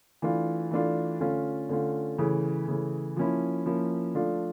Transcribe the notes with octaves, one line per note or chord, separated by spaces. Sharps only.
E3 A3 D4 F4
E3 A3 D4 F4
D3 A3 C#4 F4
D3 A3 C#4 F4
C#3 E3 A3
C#3 E3 A3
F3 A#3 C#4 E4
F3 A#3 C#4 E4
F3 A3 D4 F4